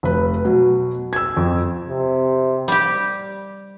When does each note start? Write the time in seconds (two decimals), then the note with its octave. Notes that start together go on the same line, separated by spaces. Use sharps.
0.03 F1 B4
0.45 B2 F#3
1.13 E6 G#6
1.37 F2
1.89 C3
2.68 G3 G4